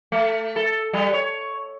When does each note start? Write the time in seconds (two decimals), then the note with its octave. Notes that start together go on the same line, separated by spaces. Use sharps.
0.12 A3
0.56 A4
0.93 G3
1.13 C#5